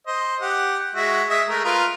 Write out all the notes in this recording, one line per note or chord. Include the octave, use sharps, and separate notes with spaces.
C5 D#5
G4 F#5
G#3 F#4 E5
G#3 E5 D#6
G#3 A3 A#4
F4 A#4 B4